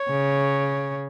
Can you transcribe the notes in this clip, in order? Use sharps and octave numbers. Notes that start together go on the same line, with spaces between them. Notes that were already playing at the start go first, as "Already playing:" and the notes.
Already playing: C#5
C#3